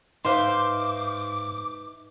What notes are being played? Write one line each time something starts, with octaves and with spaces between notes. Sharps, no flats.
G#2 D#4 B4 C5 E5 F5 D6